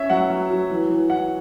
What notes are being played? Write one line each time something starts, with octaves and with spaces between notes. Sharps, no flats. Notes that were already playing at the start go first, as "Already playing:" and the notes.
Already playing: C#4 E5
F#3 F#5
F#3
F#3
E3
E3
E3 F#5